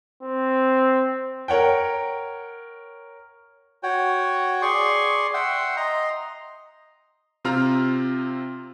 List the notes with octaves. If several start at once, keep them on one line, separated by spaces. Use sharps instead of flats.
C4
A#4 C#5 F#5 G5
F#4 C#5 G5
G#4 D5 C6 C#6
E5 F#5 G5 C6
D#5 A#5 C6
C3 C4 F4 A#5 F6